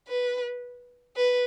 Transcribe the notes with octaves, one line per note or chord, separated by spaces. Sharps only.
B4
B4